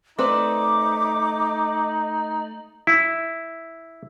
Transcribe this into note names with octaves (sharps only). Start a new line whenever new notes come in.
A3 C4 D#4 B4 D5 D6
E4